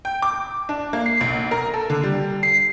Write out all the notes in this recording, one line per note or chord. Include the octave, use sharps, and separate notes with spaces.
G5
D6
D4
A#3
C7
B1
A#4
A4
D3
G3
C7